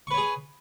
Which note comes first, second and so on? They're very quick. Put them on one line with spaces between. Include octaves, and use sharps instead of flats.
C#6 B4 C#5 G#4